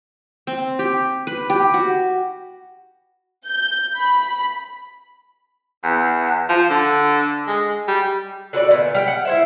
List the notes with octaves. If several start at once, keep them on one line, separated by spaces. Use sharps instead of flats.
C4
G4
B4
G4
F#4
G6
B5
E2
F3
D3
G#3
G3
D3 F#4 B4 D5
A#2 B3
G3 F5 G5
F#5
E4 C5 E5